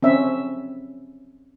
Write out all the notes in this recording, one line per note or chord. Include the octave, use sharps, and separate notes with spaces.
C4 C#4 E5